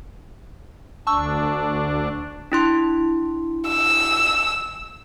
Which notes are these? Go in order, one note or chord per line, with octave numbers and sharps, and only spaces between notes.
D2 D4 A5 C#6 E6
D4 E4 C6
E6